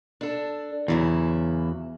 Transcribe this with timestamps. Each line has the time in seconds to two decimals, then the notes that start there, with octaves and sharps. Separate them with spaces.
0.21 D4 A4
0.88 E2 C#3 F#3 E4